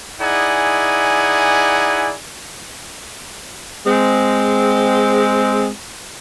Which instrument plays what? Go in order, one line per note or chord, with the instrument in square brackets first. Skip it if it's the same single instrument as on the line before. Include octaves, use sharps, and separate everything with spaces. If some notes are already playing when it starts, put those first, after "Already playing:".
[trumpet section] D#4 E4 G#4 D5 F#5 G#5
[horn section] G#3 C4